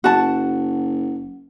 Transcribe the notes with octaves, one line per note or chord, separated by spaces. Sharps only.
F#1 F#4 A5